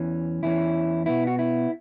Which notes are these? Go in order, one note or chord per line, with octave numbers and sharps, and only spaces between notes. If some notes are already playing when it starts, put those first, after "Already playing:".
Already playing: E2 E3 C#4
E2 E3 C#4 E4
B2 B3 E4
F#4
E4